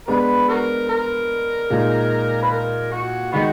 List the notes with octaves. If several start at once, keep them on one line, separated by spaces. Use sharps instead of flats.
G#3 B3 D4 B4
F#4 A#4
A#4
A#2 G#3 D#4
B4
A#4
F#4
D#3 G#3 B3 D#4 F#4